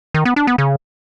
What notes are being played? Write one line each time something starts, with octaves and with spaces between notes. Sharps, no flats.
D#3
B3
D4
B3
C#3